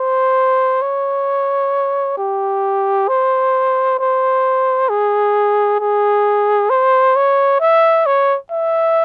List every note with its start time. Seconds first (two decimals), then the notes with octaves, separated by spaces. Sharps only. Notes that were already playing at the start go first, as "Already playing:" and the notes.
Already playing: C5
0.82 C#5
2.17 G4
3.08 C5
3.99 C5
4.89 G#4
5.80 G#4
6.70 C5
7.16 C#5
7.60 E5
8.06 C#5
8.51 E5